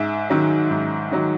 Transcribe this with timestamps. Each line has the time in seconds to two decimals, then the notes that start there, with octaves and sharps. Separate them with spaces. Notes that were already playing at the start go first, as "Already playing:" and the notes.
Already playing: G#2 E5
0.30 D#3 F#3
0.71 G#2
1.12 D#3 F#3